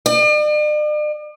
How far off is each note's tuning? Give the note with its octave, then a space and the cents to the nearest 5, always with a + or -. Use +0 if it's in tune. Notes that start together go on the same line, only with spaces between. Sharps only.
D5 +45